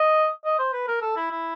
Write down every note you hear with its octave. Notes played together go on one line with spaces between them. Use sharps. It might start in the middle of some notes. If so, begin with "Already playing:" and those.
Already playing: D#5
D#5
C5
B4
A#4
A4
E4
E4